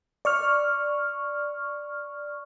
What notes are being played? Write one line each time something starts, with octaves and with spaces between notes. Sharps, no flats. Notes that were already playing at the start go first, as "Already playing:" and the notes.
D5 C#6 F6